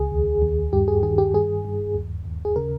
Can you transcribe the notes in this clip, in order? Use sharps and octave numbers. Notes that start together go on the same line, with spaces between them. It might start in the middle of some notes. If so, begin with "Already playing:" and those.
Already playing: C#2 G#4
D#2
D#2
G2 G4
G#4
D#3 G#4
G4
G2 G#4
G2
D#2
D#2
G#4
C#3 A#4